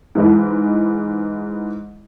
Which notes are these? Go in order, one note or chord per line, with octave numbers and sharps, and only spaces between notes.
G#2 E3 G#3 E4